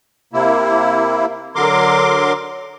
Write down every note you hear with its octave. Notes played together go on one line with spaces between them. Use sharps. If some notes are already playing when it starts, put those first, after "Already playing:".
C3 A#3 E4
D3 F#3 A#4 C6 D6